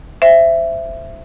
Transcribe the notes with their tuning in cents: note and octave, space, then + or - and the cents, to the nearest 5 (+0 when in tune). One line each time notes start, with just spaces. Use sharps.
C5 +0 E5 +15